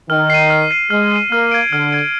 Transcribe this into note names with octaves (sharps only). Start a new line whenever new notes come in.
D#3 F6
C7 D#7
F6
C7 D#7
G#3 F6
C7 D#7
A#3 F6
G#6 D7
D3 F6
G#6 D7